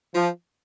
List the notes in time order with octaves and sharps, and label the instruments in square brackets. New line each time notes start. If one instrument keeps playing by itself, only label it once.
[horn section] F3